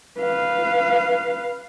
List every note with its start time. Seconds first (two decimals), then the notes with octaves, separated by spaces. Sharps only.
0.19 B4 F5